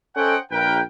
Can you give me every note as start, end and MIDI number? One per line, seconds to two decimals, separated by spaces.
0.16 0.37 61
0.16 0.37 69
0.16 0.37 72
0.16 0.37 75
0.16 0.37 78
0.16 0.37 79
0.51 0.81 34
0.51 0.81 70
0.51 0.81 71
0.51 0.81 79